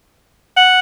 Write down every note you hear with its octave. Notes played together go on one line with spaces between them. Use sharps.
F#5